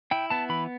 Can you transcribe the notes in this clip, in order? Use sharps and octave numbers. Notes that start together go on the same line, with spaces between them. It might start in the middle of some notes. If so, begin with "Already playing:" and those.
E4 G5
B3 A5
E3 B5